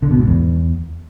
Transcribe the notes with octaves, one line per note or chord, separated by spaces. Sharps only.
D3
B2
G#2
E2